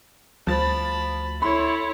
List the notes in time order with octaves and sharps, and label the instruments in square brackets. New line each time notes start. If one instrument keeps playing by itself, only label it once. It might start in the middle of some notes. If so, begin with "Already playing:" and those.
[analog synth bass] D2 [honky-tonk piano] F3 A6 [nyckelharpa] A5 B5
[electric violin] E4 C#5 [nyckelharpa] A4 [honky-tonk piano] B5 C6